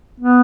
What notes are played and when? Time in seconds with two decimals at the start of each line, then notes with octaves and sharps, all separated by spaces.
0.20 B3